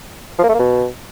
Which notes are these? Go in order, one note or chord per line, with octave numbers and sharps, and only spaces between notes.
F3
A#3
A3
A#3
B2